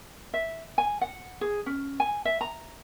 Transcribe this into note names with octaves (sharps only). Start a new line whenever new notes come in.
E5
G#5
F#5
G#4
C#4
G#5
E5
A#5